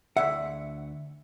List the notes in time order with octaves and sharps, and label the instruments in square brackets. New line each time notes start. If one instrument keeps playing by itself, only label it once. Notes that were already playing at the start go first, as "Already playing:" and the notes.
[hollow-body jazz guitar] D2 F#5 [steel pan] E5